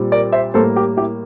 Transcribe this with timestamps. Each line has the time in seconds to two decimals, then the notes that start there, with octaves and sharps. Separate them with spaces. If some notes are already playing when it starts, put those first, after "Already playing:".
Already playing: A#2 G3 C4
0.12 A#4 D5
0.33 C5 E5
0.54 A2 G3 A#3 A4 C5
0.76 G4 A#4
0.97 E4 G4